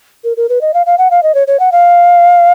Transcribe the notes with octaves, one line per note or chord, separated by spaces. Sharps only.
A#4
A#4
B4
D#5
F5
F5
F#5
F5
D#5
C#5
C#5
F#5
F5